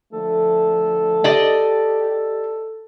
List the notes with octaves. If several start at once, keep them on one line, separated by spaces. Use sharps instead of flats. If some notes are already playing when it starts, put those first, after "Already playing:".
D3 F3 A3 A4
G4 D5 D#5